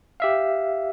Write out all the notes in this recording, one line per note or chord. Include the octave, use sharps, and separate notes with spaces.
G4 E5 F5